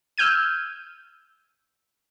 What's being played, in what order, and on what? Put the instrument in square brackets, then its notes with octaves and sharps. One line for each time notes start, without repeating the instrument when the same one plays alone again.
[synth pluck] E6 F6 G6 G#6 D#7